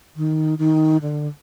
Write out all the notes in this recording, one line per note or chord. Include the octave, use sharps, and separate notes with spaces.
D#3
D#3
D3